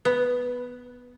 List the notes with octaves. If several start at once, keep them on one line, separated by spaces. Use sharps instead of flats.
B3